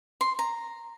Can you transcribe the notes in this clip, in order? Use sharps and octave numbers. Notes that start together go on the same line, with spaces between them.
C6
A#5